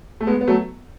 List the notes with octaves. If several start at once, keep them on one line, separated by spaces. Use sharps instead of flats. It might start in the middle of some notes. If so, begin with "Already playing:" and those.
A3
G#3 B3
B3
F#3 A3